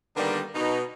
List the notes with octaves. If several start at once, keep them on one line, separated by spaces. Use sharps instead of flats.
D3 D#3 G3 A#3 B3 D4
B2 D#4